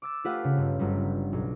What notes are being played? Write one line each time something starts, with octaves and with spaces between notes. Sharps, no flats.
D6 E6 A6
A3 F4 G4 B4 F5 F#5
C#3
G1
G1 F#3 G3
B1 F#3